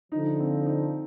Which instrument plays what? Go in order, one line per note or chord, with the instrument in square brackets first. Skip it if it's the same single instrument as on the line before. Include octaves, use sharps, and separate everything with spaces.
[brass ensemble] D3 F3 [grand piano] D#4
[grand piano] C4
D#4